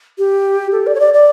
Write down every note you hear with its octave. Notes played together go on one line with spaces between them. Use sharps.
G4
A4
D5
C#5
D5
D5